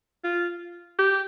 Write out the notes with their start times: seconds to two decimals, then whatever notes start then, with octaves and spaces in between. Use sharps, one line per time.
0.24 F4
0.99 G4